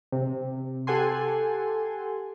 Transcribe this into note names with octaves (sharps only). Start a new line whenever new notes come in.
C3
G4 A4 F#5 G#5 C6